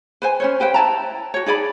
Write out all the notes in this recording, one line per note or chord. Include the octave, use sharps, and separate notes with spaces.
B4 C5 G#5
C#4 C5 C#5
G4 B4 C5 G5
E4 A5 A#5
F#4 C#5
D#4 G#4 D5 B5